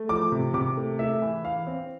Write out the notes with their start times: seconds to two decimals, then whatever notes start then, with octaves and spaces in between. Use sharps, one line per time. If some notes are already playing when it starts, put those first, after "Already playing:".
Already playing: A3
0.09 F3 D6
0.32 C3
0.54 C3 D6
0.77 A3
0.99 A3 E5
1.22 E3
1.44 E3 F5
1.67 C4